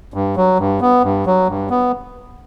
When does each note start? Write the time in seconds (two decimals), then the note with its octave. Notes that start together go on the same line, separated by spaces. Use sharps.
0.14 G2
0.36 F#3
0.58 G2
0.81 B3
1.03 G2
1.26 F#3
1.48 G2
1.70 B3